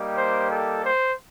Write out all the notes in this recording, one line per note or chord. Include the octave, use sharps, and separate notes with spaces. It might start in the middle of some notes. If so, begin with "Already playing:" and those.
Already playing: G3 A#3 D#4 G4
C5
A4
C5